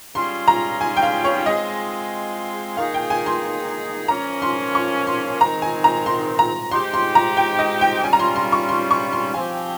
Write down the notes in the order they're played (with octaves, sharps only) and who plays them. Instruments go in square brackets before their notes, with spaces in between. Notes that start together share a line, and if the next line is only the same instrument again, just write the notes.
[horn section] G3 C#4 F4 G#4 [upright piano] C6
[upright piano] A#5
G#5
G5
F5
C#5
[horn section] G#3 C4 F4 G#4 [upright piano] D#5
[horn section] D#3 A#3 D#4 G#4 [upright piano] F5
[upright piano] G5
G#5
C6
[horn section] A#2 F3 A#3 C#4 [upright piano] A#5
[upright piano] C6
C#6
C6
[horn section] D#3 G#3 C4 [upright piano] A#5
[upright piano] G#5
A#5
C6
A#5
[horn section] G#3 C4 D#4 G4 [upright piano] C6
[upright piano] C6
A#5
G5
D#5
G5
[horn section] G3 C#4 F4 [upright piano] G#5
[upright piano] A#5
C6
C6
C#6
C6
C#6
C6
[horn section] F3 C4 G4 [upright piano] G#5